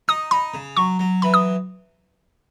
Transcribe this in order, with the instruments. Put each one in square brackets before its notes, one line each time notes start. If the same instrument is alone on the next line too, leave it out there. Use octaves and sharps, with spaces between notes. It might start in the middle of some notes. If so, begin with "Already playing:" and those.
[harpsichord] D#4 [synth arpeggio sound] D#6
[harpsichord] D#4 [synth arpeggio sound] B5
[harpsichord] C#3
[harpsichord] F#3 [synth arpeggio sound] C#6
[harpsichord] F#3
[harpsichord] E3 [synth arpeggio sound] B5
[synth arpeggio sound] D#6